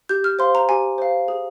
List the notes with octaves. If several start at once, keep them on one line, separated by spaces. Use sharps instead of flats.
G4 G6
F6
C5 F5 C6
A#5
G4 G#5
C5 F5
G#4